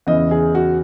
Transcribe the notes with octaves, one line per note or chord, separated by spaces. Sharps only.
E2 C#3 E3 D#5
G#4
F#4